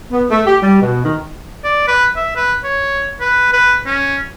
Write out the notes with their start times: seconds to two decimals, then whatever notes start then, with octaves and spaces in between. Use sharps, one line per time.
0.12 B3
0.30 A3
0.47 G4
0.63 G3
0.82 B2
1.05 D#3
1.64 D5
1.87 B4
2.16 E5
2.36 B4
2.64 C#5
3.20 B4
3.53 B4
3.86 C#4